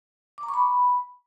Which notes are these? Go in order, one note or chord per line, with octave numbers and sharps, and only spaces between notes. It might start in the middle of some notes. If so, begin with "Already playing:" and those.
D6
A#5
C#6
B5